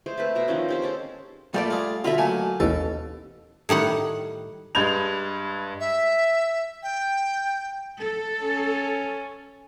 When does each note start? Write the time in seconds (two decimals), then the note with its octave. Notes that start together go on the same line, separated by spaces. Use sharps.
0.06 G#3 A3 C5
0.18 A3 C4 B4
0.35 B2 E5 A#5
0.48 D#3 F3 C4 C#4
0.69 C4 G4 C5
0.82 G#3 C#4 A4 C5
1.54 A#2 G3 A3 D5
1.70 F4 G#4
2.04 B2 D3 F4 E5 B5
2.18 C#2 F#3 A3 A#3 G#5
2.60 A1 D#2 B2 A4
3.69 A2 D#3 G3 F#5
4.75 G2 G#3 B5 G6 G#6 F7
5.80 E5
6.83 G5
7.99 A4
8.44 C#4